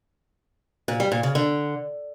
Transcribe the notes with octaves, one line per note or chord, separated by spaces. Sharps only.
A#2
G3
A#2
C#3
D3